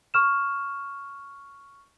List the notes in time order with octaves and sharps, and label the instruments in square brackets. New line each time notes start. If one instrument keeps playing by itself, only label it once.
[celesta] C#6 F6 E7